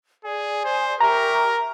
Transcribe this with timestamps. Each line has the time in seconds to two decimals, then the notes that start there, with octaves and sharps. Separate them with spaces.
0.24 G#4 D5 G#5
0.64 C5
1.00 G4 A#4 E5 A#5 C#6